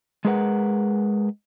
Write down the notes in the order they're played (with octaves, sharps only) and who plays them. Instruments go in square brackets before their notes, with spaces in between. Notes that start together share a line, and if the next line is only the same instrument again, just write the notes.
[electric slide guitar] G#3 G#4 A#4 B4 F#5